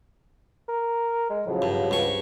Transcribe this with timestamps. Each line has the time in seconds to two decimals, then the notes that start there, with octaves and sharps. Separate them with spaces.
0.68 A#4
1.30 G#3
1.46 A2 C#3 F3 F#3
1.62 G2
1.91 C#2 G2 C#6